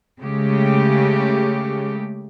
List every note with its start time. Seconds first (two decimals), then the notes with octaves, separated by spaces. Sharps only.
0.21 C#3 G#3 A3 G4